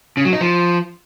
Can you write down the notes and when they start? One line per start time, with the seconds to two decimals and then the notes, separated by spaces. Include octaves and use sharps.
0.17 C#3
0.25 F#3
0.33 D#4
0.41 F3